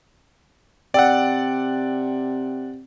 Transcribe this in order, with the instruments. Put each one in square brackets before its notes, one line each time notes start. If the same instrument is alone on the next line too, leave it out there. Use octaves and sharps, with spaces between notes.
[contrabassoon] C3 [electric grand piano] D5 F#5 [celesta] G5 E6